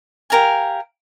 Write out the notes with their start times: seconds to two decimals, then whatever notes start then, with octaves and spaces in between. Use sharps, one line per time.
0.30 G4 A#4 F5 G#5